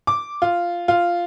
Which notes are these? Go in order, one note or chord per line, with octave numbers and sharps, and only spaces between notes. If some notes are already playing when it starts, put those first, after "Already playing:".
D6
F4
F4